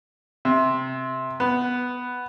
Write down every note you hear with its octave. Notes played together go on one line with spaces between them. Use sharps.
C3
B3